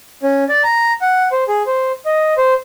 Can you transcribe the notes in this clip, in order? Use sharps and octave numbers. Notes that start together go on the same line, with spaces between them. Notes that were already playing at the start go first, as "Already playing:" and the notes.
C#4
D5
A#5
F#5
C5
G#4
C5
D#5
C5